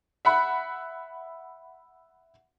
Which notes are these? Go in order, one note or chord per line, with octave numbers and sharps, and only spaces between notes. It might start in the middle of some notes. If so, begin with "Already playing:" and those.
E5 F#5 B5